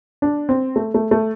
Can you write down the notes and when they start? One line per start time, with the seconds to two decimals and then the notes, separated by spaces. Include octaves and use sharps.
0.22 D4
0.49 C4
0.76 A3
0.94 A3
1.11 A3